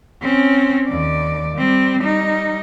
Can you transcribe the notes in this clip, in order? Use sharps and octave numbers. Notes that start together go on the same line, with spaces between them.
C4 C#4
D#2 D5
G3 C4
G3 D#4